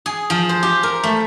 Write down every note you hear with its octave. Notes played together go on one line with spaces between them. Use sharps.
G#4
F3
C5
G4
A#4
A3